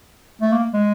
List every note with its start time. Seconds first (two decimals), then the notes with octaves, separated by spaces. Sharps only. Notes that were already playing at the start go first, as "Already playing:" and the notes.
0.41 A3
0.52 A#3
0.73 G#3